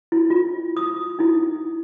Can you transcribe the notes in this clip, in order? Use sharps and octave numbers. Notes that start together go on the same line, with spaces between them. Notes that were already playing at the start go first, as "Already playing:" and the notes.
E4
F4
D#6
D#4 E4